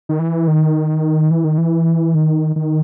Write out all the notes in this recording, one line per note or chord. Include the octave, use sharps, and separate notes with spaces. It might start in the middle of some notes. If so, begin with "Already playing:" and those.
D#3
E3
D#3
E3
D#3
E3
D#3
D#3